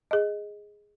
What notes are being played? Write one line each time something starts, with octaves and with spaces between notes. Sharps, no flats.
G#4 D#5